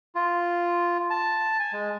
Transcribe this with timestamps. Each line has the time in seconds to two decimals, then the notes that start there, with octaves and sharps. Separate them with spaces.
0.15 F4
1.10 A5
1.60 G#5
1.73 G#3